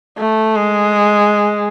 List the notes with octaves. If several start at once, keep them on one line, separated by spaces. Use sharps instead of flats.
A3
G#3